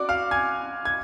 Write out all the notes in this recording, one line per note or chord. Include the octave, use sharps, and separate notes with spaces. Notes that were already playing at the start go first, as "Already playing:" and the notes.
Already playing: F#4 D5 D6
F5 F6
G#5 G#6
G#6